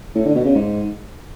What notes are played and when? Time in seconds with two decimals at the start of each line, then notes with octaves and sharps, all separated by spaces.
0.15 A2
0.25 D3
0.35 B2
0.45 C#3
0.55 G#2